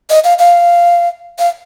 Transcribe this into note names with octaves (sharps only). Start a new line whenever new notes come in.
D#5
F5
F5
F5